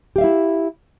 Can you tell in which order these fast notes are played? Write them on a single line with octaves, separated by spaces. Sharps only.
G4 F5 E5 E4